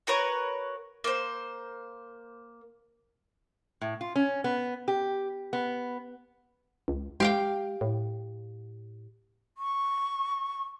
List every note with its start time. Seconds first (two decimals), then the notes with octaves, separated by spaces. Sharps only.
0.07 F#4 A#4 B4 C#5
1.04 A#3 C5
3.81 A2
4.01 F4
4.16 C#4
4.44 B3
4.88 G4
5.53 B3
6.88 C#2
7.20 G#3 G4 F5 G5
7.81 A2
9.58 C#6